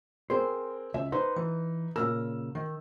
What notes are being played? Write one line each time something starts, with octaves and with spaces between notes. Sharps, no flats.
C4 G#4 A#4 C5
C#2 E5
D#4 B4 C5
E3
A#2 C#3 A#4 E6
D#3